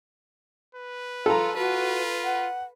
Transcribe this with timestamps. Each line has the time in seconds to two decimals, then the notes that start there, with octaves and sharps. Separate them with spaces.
0.75 B4
1.26 F4 A4 A#5
1.56 F4 F#4 B4
2.24 F#5